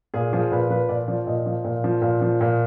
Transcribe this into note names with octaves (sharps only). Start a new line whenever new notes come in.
A#2 G#4
F3 G#4
A#2 B4
F3 B4
A#2 D5
F3
A#2 D#5
F3
A#2
F3
A#2
F3
A#2